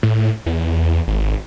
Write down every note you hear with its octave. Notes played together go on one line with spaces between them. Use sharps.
A2
E2
G#1